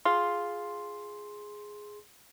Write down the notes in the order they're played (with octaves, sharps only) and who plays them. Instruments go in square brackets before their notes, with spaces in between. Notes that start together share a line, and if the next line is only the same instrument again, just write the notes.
[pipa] F4 [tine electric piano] G#4 C6